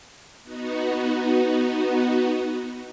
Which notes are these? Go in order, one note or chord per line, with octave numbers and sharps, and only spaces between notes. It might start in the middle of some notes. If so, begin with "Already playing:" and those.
B3 D#4 F#4